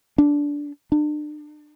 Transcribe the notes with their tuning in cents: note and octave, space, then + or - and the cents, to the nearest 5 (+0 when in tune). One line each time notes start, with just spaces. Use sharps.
D4 -15
D4 +35